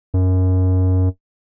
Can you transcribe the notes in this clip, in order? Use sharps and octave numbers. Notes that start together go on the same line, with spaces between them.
F#2